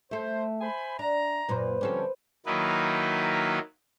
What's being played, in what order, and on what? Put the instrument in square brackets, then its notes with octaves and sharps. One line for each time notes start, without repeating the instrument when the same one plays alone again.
[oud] A3 A4 [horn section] C5 [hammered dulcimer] E5
[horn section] C5 G#5 B5
[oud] D4 [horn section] A#5
[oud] F#2 A#2 [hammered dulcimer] B4 C5
[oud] D3 C4 A4 [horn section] F3 G3 C#4
[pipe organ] D#3 F#3 A#3 D#4 E4 B4